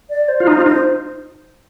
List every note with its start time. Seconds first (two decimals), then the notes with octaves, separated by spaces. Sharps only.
0.10 D5
0.28 C5
0.40 F4
0.47 D#4 C5
0.57 F4
0.66 D#4 C5